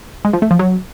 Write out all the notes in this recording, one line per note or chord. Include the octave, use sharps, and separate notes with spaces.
G#3
F3
A3
F3
F#3